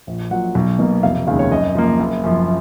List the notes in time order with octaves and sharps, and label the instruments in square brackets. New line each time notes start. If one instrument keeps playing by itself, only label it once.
[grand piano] A#1
A#2 F#3 F#5
B1
B2 A#3
F1 F5
D#2 C#3 G#3 F5
C#5
F#2 D#5
F3 A#3
F#1
F#2 F3